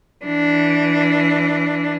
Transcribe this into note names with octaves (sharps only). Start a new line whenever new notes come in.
E3 D4